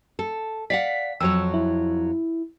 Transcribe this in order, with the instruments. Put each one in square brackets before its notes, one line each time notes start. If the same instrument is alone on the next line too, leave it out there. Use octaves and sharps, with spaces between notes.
[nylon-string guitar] A4
[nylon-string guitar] D5 F5 F#5 [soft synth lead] B6
[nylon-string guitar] F2 F#3 C#5 [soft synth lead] E6
[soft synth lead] E4